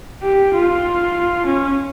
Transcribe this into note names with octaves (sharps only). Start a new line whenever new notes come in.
G4
F4
C#4